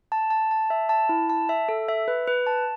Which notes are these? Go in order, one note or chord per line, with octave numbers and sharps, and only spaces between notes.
A5
A5
A5
E5
A5
E4
A5
E5
A4
E5
B4
B4
A5